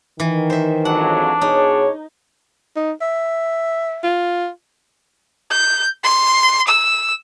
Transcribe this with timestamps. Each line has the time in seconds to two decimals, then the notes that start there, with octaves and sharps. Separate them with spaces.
0.20 D#3 E3
0.50 C5 E5
0.85 F2 G#2 F#3 D4 F#5
1.41 B2 B3 D#4 G#4 C#5
2.76 D#4
3.01 E5
4.03 F4
5.51 G6
6.04 C6
6.68 E6